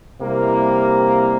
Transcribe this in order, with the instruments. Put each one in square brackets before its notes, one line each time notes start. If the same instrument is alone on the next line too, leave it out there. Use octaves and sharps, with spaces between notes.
[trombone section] C3 G3 A#3 E4 A#4